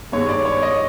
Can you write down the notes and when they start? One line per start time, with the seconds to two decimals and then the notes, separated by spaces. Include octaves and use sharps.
0.12 G2 D#3 G#3 C#5
0.29 D5
0.45 C#5
0.63 D#5